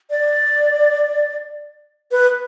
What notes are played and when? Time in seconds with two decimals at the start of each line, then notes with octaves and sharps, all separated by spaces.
0.10 D5
2.12 B4